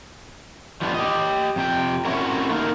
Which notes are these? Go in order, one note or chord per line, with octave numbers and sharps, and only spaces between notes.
F3 G3 B3 D4
G4 D#5
F2 C3 G5
A3 C4 C#4 E4 F#4 A#4
A3 A#3 D#4 A#4